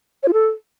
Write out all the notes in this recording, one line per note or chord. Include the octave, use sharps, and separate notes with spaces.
C#5
F4
A4